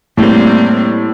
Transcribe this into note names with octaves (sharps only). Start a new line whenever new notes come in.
A2 G3 A#3 C4